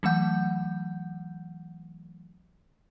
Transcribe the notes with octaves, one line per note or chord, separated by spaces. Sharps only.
E3 F#3 A3 F#5 G6